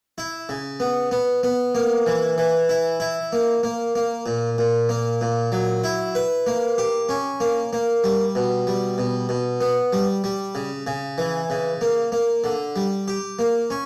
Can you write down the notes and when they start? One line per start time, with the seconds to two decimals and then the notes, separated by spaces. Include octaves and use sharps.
0.18 E4
0.49 C#3
0.80 B3
1.11 B3
1.43 B3
1.75 A#3
2.06 E3
2.38 E3
2.69 E4
3.00 E4
3.33 A#3
3.63 A#3
3.95 A#3
4.26 A#2
4.58 A#2
4.89 A#3
5.21 A#2
5.52 F#3
5.84 E4
6.15 B4
6.47 A#3
6.78 G4
7.09 C#4
7.40 A#3
7.73 A#3
8.04 G3
8.35 B2
8.67 G3
8.98 B2
9.29 B2
9.61 B3
9.93 G3
10.24 G3
10.55 C#3
10.87 C#3
11.18 E3
11.50 C#3
11.81 A#3
12.12 A#3
12.44 D3
12.76 G3
13.08 G4
13.39 A#3
13.70 C#4